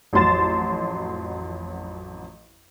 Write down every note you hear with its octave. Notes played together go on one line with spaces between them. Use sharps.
A1 F2 F#3 C6 A6 E7